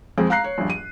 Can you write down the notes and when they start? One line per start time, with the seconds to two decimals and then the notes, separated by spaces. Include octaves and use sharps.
0.18 F2 G#3 C4
0.30 F5 A#5 F#6 C7
0.44 C#5
0.58 A#1 G2
0.70 D#7